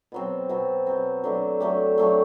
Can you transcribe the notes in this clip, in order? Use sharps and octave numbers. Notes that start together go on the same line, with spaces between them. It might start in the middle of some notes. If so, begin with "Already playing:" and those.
B2 F#3 C4
B2 F#3 C4
B2 F#3 C4
F#3 A3 D4 G4
F#3 A3 D4 G4
F#3 A3 D4 G4